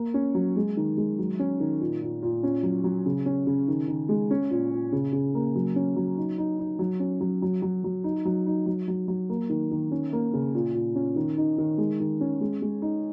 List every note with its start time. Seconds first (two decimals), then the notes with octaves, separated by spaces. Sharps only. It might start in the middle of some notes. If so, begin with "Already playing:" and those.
Already playing: A#3
0.14 C#4
0.35 F#3
0.56 G#3
0.77 D#3
0.97 G#3
1.19 F#3
1.39 C#4
1.60 D#3
1.80 A#2
2.02 A#2
2.22 A#2
2.43 C#4
2.63 F#3
2.84 F#3
3.06 C#3
3.26 C#4
3.47 C#3
3.68 D#3
3.88 D#3
4.09 G#3
4.31 C#4
4.50 A#2
4.71 A#2
4.92 C#3
5.13 C#3
5.35 A#3
5.55 F#3
5.76 C#4
5.96 F#3
6.17 D#4
6.38 D#4
6.59 D#4
6.79 F#3
7.00 C#4
7.21 F#3
7.42 F#3
7.62 F#3
7.84 F#3
8.04 D#4
8.25 F#3
8.46 D#4
8.66 F#3
8.88 F#3
9.08 F#3
9.29 A#3
9.49 D#3
9.71 D#3
9.91 C#4
10.13 A#3
10.33 C#3
10.54 A#2
10.74 A#2
10.95 C#4
11.16 D#3
11.37 D#4
11.58 D#3
11.78 G#3
12.00 D#3
12.21 C#4
12.41 G#3
12.62 G#3
12.82 D#4